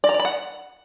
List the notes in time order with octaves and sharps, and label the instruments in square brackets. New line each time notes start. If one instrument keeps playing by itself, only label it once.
[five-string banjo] D5
A#5
D5
B5
F#5